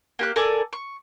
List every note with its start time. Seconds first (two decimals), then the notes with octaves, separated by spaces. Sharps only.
0.19 A#3 G4 F#6
0.36 A4 A#4 D5 G#5
0.73 C#6